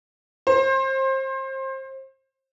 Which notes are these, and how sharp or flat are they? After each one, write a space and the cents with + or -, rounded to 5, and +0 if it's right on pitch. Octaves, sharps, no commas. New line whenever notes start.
C5 +30